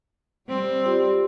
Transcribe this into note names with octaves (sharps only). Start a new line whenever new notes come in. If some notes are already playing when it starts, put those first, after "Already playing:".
G3 C4
F4 G4 D5